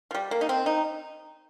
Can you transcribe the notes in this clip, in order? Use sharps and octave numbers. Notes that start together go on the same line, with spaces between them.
F3
G3
A#3
D#4
C4
D#4